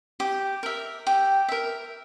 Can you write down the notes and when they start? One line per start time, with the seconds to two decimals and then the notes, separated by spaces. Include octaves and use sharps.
0.20 G4
0.63 A#4 E5
1.07 G4
1.48 A#4 E5